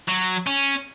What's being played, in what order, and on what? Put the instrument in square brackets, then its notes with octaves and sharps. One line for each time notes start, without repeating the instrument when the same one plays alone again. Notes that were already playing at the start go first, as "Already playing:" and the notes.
[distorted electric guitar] F#3
C#4